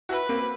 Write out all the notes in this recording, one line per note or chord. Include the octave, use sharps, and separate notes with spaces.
E4 F#4 B4
A#3 C4